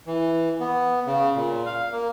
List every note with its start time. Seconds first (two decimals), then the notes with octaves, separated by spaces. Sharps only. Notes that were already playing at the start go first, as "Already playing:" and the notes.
0.07 E3
0.60 B3
1.06 C#3
1.36 A#2
1.66 F5
1.92 A#3